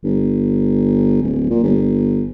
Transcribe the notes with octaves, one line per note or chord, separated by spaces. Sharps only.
G1
D1
A#2
G1